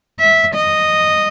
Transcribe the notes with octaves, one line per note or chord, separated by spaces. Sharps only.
E5
D#5